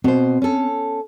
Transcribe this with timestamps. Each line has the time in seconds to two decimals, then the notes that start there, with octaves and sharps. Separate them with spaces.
0.04 B2 C4 C5
0.42 C#4 A4